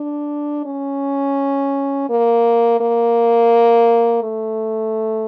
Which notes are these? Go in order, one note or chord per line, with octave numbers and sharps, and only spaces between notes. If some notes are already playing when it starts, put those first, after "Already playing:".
Already playing: D4
C#4
A#3
A#3
A3